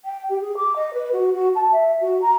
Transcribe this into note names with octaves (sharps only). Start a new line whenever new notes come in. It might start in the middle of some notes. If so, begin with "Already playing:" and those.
G5
G4
G#4
D6
D#5
B4
F#4
F#4
A5
E5
F#4
A#5